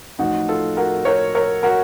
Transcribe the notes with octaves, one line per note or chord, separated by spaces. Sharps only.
A1 A2 F3 D#4 F#4
F4 A4
F#4 A#4
A#4 C#5
A#4 C#5
F#4 A#4